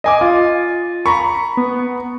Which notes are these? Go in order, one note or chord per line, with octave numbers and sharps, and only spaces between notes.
D#5 G#5 D6
F4
A#5 B5 C#6
B3